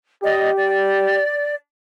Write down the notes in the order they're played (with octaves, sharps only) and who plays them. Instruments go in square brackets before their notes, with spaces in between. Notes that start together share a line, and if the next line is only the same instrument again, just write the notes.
[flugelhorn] G4 [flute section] D5 D#5
[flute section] D5